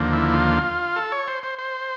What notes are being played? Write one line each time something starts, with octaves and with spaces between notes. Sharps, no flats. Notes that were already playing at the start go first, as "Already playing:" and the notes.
Already playing: D#2 D3 F3 A#3
E4
F4
A4
C#5
C5
C5
C5